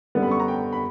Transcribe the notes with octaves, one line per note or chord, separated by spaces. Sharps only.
F#2 D3 G3 B3
B5
C#6
A#5
G5
B5